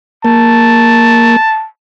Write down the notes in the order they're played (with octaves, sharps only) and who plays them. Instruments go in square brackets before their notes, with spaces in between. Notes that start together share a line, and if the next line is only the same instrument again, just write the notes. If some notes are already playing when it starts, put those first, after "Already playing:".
[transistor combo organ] A#3 [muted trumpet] A5